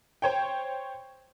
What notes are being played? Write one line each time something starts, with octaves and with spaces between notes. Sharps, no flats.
C5 C#5 G5